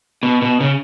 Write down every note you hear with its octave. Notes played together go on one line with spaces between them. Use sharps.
B2
B2
C#3